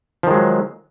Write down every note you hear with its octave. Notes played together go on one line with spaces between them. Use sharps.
D#3 F3 F#3 G#3